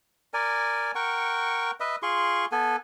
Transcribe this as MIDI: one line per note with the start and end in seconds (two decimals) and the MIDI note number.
0.34 0.92 70
0.34 0.92 74
0.34 0.92 80
0.95 1.71 70
0.95 1.71 78
0.95 1.71 79
0.95 1.71 85
1.80 1.96 71
1.80 1.96 75
1.80 1.96 76
2.02 2.46 65
2.02 2.46 68
2.02 2.46 84
2.02 2.46 85
2.52 2.76 59
2.52 2.76 69
2.52 2.76 80